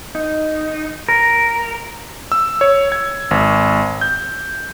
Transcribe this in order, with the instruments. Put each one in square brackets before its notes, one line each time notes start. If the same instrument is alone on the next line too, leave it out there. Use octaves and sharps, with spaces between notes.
[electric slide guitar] D#4
A#4
[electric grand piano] E6
C#5
G#6
G#1
G6